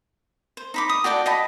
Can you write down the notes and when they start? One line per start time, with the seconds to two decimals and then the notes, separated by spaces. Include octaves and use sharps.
0.57 C5
0.74 D#4 B5 D6
0.89 D#6
1.04 F#4 D5 G5 A5
1.26 D#5 F#5 A5 B5